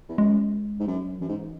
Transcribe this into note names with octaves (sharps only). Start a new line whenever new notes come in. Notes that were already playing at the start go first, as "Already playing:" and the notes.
E2
F#2 G#3
G#2
F#2 F#3
F#2 E3
G#2